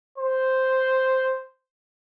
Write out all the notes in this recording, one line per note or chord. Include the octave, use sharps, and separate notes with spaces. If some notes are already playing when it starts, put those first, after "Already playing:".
C5